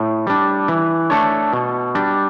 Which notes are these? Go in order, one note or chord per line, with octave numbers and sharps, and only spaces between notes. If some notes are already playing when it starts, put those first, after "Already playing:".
Already playing: A2
G3 D4
E3
A3 D4 A4 C#5
B2
G3 D4